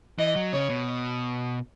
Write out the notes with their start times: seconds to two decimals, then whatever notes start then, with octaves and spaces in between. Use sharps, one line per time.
0.19 E3 D#5
0.36 F#3
0.53 C#3 C#5
0.70 B2